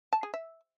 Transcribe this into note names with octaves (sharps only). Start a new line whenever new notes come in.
A5
G#4
E5